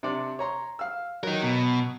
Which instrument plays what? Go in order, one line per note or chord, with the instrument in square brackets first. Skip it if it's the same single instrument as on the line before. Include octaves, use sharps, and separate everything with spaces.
[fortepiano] C3 D4 D5
C#5 A#5 C6
F5 E6
[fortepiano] F#3 [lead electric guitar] D#4 A#4
[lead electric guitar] B2